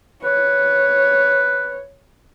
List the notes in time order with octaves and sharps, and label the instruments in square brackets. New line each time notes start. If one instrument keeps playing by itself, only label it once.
[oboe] B4 [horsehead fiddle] C#5